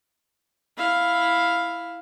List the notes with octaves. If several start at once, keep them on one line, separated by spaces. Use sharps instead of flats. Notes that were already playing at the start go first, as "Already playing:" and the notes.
E4 F5